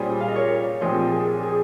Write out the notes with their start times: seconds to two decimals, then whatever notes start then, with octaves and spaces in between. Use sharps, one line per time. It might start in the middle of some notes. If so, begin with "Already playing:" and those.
Already playing: A#2 G3 C#4 G#4 C5
0.20 F5
0.28 D#5
0.35 A#4 C#5
0.81 A#1 A#2 F3 C4 G4 G#4 C5
1.12 G#4
1.43 G#4